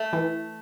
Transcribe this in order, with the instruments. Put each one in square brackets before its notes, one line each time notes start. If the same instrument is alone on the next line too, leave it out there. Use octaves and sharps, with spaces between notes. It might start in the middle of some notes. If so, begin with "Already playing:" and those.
Already playing: [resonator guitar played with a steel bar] A3
[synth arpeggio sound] E3